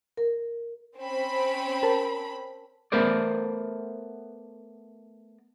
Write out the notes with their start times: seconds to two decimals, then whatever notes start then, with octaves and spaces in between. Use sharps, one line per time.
0.17 A#4
0.98 C4 C#4 B5
1.83 A#4 A5
2.92 A3 B3 A#4 C5 D5